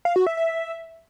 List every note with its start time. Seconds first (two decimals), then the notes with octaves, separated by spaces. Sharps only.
0.05 F5
0.16 F#4
0.27 E5
0.37 E5